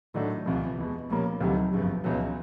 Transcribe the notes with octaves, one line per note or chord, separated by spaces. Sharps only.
A2 D#3 F#3 A3 D4 F#4
C2 C3 E3 F3
E2 B2 G#3
B1 A#2 F3 G3 A#3 C#4
D2 C3 D#3 F#3 G3
G1 F#2 C#3 F3
C#2 B2 E3 F#3